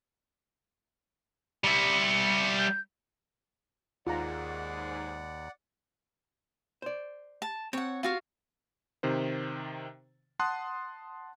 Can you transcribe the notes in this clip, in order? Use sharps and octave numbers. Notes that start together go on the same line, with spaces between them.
G3 E5 C#7
G6
D#2 G#2 F4 D5 F#5 A#5
C5 D5
A5
C4 C#5 F#5
F4 F#4 F5
C3 D#3 C5
F#5 A5 C6 D#6 F#6